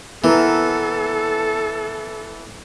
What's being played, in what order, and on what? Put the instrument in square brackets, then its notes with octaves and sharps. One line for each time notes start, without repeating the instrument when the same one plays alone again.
[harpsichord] E3 [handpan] B3 E4 A#4 [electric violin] A4